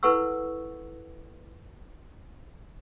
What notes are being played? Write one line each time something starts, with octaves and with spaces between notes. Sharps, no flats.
E4 A4 B4 F#5 C#6 E6